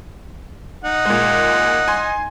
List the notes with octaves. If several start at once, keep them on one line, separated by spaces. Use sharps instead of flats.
D#4 F#5
A#2 G#3
G#5 C6